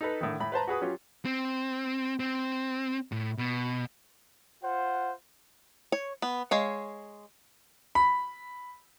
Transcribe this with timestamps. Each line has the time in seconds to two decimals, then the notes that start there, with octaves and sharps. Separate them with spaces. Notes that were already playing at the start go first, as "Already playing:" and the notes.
0.01 D#4 A4 B4
0.21 A2 D3 D#3
0.40 A2 B5
0.52 B4 C5 A5 A#5
0.67 F#4 G#4 B4 D#6
0.81 F#3 C#4 F4 G4
1.25 C4
2.20 C4
3.12 A2
3.38 B2
4.63 F4 C5 F#5
5.92 C#5
6.22 B3
6.51 G#3 C#5 F5
7.95 B5